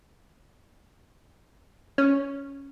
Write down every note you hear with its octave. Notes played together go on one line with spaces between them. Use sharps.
C#4